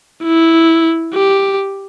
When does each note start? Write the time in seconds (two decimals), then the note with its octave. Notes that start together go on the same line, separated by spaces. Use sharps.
0.23 E4
1.14 G4